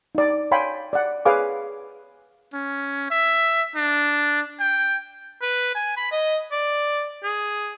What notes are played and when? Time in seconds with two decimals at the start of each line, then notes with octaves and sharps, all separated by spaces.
0.15 D#4 D5
0.51 C#5 F5 G5 G#5 B5 C6
0.93 D5 F#5
1.25 G#4 B4 C#5 F5 G#5 D6
2.53 C#4
3.10 E5
3.76 D4
4.60 G5
5.42 B4
5.75 G#5
5.97 B5
6.12 D#5
6.52 D5
7.23 G#4